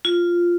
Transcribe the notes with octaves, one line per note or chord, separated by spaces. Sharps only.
F4